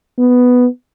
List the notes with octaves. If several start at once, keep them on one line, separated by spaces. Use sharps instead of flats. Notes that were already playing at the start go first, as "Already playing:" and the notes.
B3